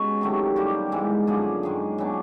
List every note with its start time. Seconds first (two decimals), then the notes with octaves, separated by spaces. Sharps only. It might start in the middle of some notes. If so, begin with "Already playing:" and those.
Already playing: B2 G#3 C#4 F#4
0.21 C3 D#3 F#3 A3
0.56 B2 G3 A#3 G4
0.92 G#2 E3 G#3
1.27 F#2 D3 F3 A#3 G#4
1.63 F#2 D#3 G#3 G#4
1.98 A#2 F#3 B3 D4